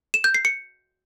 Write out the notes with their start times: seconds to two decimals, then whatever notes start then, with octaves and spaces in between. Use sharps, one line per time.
0.14 E7
0.24 G6
0.34 C7
0.45 C#7